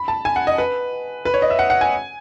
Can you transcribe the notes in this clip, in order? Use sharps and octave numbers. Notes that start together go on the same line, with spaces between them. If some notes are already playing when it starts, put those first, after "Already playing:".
Already playing: B5
A5
G#5
F#5
D#5
B4
B4
C#5
D#5
E5
F#5
F#5
G#5